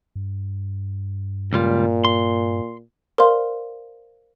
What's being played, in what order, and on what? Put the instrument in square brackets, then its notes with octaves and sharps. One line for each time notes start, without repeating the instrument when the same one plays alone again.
[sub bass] G2
[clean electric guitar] C#2 G3 F4 [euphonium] A#2
[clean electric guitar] C6
[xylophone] A#4 C5 D5 F5 C6